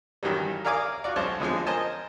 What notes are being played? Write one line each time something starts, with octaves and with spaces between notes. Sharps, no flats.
G2 D#3 E3 F#3 G3
A#4 D5 F5 G#5 D6 D#6
F4 F#4 D5
B1 G#3 C#4 C5 A5
B2 D3 F3 G#3
A#4 C5 D#5 G#5 A5